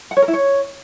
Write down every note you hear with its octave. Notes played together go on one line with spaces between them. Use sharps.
F#5
C#5
A#4
E4
C#5